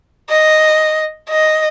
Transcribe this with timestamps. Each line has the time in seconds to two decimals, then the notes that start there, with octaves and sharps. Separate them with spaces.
0.30 D#5
1.30 D#5